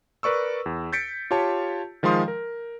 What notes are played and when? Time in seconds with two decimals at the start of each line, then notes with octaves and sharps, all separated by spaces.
0.23 A#4 B4 D5 C#6 E6
0.66 E2
0.93 G6 A6 B6 C#7 D7
1.31 F4 G4 C#5 A5
2.03 D#3 F3 G#3 F5 C6 D#6
2.28 A#4